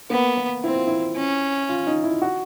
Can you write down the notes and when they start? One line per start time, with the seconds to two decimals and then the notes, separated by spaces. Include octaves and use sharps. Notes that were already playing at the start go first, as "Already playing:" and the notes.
0.10 A#3 B3
0.37 A#3
0.64 C4 E4
0.76 F4
0.87 E4
1.16 C#4
1.69 F4
1.87 D#4
2.04 E4
2.22 F#4